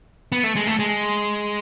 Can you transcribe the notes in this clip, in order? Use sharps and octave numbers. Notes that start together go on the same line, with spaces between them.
B3
A3
G#3
A3
G#3